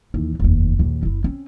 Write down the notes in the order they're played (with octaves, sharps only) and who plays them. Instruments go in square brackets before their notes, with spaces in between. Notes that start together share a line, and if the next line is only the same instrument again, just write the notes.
[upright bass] D#2 E3
F1 D#2
A#1 D#2
F#1 E4
C4 C#4